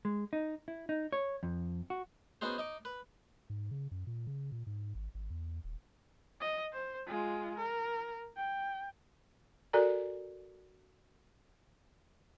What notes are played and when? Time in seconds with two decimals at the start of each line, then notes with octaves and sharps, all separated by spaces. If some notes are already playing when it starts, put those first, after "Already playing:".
0.05 G#3
0.33 D#4
0.68 E4
0.89 D#4
1.13 C#5
1.43 F2
1.90 F#4
2.41 B3 C#4 D#4 F#4 G#4 C5
2.58 D#4 D#5 D6
2.85 B4
3.50 G#2
3.71 C#3
3.91 F#2
4.07 A#2
4.27 C#3
4.52 A#2
4.67 G#2
4.95 G#1
5.15 G#1
5.30 E2
5.64 D#1
6.40 D#5
6.72 C5
7.07 G#3 F4
7.57 A#4
8.36 G5
9.73 F#4 A4 A#4 D5 G#5 A#5